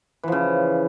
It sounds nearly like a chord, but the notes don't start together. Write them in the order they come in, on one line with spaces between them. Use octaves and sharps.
E3 F3 C#3